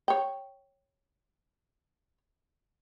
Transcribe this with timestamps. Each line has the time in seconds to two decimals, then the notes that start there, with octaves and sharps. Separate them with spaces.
0.08 C#5 G5